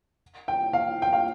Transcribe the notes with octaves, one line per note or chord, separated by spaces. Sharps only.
G5
F5
G5
F5